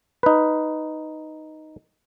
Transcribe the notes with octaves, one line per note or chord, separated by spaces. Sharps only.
D#4 B4